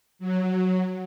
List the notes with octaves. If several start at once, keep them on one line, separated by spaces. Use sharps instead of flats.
F#3